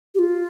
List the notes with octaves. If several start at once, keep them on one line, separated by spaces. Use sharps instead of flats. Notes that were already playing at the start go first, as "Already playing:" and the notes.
G4
F4